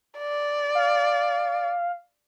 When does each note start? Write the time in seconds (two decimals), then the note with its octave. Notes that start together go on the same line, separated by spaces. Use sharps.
0.18 D5
0.75 F5